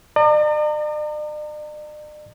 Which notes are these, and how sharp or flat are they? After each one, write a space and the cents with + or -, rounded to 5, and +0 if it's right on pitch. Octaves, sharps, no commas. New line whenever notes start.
D5 +45 A#5 -35